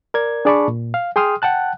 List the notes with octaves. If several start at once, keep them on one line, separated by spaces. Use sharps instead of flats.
A#4 D5 G#6
D4 G#4 D5 A5 B5 C#6
A#2
F5
G#4 G5 C6 D#6 F6
F#5 G5 A5 F#6